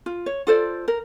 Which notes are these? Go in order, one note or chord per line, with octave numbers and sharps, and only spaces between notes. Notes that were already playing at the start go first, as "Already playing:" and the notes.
F4
C#5
F4 A4 C5 D5
A#4